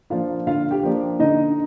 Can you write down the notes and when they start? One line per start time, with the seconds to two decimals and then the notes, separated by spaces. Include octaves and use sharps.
0.10 F3 A#3 D4 F4 F5
0.47 D3 F4 F5
0.71 G4 G5
0.83 F3 A#3 D4
1.19 D3 D#4 D#5